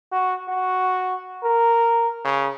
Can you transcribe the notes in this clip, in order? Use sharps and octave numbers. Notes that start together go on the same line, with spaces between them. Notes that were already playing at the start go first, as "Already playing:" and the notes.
F#4
F#4
A#4
C#3